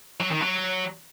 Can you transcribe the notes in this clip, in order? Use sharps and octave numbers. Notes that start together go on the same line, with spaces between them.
F#3
D#3
F#3